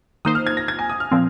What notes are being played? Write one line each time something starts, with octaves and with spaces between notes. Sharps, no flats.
D#3 A#3 D#4 C5 D#6
F6
G#6
A#6
G#6
G#5
D#6
F6
A#2 F3 C4